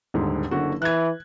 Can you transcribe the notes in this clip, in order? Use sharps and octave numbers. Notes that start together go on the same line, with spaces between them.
D#1 G#2 D3
F#1 D3 F#4
E3 F#6 G#6